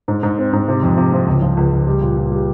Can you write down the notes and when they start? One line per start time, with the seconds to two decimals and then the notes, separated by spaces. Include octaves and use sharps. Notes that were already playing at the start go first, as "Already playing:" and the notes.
0.08 G#2
0.23 G#2
0.38 C4
0.53 G#2
0.68 C3
0.83 F2
0.97 C3
1.12 F3
1.27 C#2
1.42 F3
1.57 C#2
1.72 C#2
1.87 G3
2.01 A#2
2.16 A#2
2.31 G3